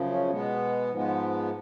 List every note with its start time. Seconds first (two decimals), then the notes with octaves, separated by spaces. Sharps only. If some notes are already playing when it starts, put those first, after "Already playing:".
Already playing: F#2 C#3 F3
0.10 C#4
0.30 B2 G#3 B3
0.91 G#2 F3 G#3 B3